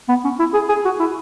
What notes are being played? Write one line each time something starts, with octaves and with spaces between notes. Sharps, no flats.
B3
C#4
E4
G#4
G#4
F#4
E4